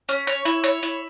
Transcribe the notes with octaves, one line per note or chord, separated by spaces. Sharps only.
C#4
C#5
E4
C#5
E4